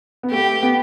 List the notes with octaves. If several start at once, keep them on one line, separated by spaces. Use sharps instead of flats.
B3
A3 G4
B3